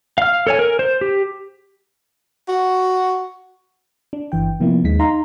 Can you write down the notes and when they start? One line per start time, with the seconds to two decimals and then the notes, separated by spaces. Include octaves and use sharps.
0.18 F5 F6
0.47 A4 C#5 G#5
0.59 A#4
0.79 C5
1.01 G4
2.48 F#4
4.13 D4
4.32 G1 E3 G5
4.60 C3 F3 A#3 B3 E4
4.84 D#2 D#3 G#3 B6
4.99 D#4 F5 A#5 C6